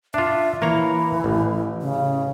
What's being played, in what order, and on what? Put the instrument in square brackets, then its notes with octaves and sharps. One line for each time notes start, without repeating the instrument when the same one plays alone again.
[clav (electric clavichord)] D4 F4 [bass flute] E5
[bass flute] E3 [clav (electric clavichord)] A#3 C#5 A#5
[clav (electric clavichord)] A1
[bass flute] C#3